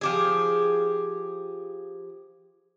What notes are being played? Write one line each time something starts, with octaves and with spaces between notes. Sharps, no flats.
F3 G4 G#4